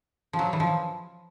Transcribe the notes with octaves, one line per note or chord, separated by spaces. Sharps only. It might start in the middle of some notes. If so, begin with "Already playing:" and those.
F3
F#3
E3
F3